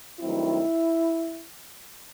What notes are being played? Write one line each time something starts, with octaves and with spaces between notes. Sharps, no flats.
G2 D#3 F#3 A3 C4 E4